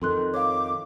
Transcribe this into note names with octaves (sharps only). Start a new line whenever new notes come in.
F2 D#3 A4 C6 F#6
C#5 F5 D6